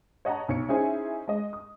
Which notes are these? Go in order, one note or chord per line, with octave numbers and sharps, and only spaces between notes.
C#5 D#5 F#5 A5 A#5
B1 C#5 C#7
C#4 D#4 E4 G#4 C5 G#5
G#3 D#5
D#6